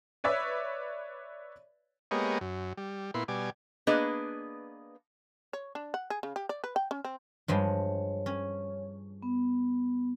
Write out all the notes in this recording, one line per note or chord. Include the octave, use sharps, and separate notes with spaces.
B4 C#5 D5 E5
G#3 A#3 B3 G4 C#5 D#5
F#2
G3
A#2 B3 E4 C6
B2 G3 D5 G#5
A#3 B3 D4 G#4 B4 D#5
C#5
D4
F#5
G#4
C#3
G4
D5
B4
G5
C#4
C4
G2 F3 G#3 C#5
C#4
B3